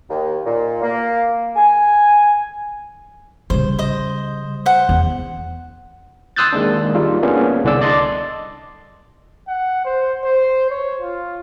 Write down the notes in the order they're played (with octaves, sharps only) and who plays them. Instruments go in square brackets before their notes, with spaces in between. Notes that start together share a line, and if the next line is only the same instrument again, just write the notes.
[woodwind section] D#2
A#2
A#3
G#5
[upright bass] C#3 G3 [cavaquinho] C5
[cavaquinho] C5 D#5
C5 F#5
[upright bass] E2
[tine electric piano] C6 D#6 E6 F#6 G6 A6
D#3 G#3 A#3 D4
G3 D#4 F4
A#3 B3 C#4 D4 G#4
C2 D3 D5 E6
D5 D#5 A5 C6 D6
[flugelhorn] F#5
C5
C5
C#5
F4